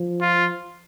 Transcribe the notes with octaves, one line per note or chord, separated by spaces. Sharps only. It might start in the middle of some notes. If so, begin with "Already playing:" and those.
Already playing: F3
F4